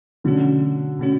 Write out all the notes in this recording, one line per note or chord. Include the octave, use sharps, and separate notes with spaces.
B2 D3 F#3 A3 C#4 F#4
B2 A3 C#4 F#4